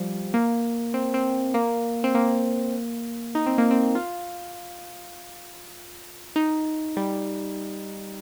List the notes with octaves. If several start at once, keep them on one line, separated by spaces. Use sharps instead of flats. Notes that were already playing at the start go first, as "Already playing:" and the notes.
Already playing: F3 G3
A#3
C4
C4
A#3
C4
A#3
D#4
C4
A#3
C4
F4
D#4
G3